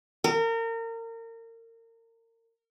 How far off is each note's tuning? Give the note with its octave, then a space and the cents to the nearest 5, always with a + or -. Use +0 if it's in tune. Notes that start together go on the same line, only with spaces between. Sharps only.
A#4 -30